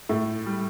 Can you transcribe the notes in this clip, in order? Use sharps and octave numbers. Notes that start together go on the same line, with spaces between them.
A2 A3
G3